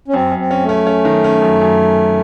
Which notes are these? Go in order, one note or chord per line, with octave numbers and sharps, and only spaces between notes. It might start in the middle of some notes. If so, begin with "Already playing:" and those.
C#4
F#2 C4
F#2
C4
C#4
A3
C#4
C#4
D#3
C#4
F#2
F#2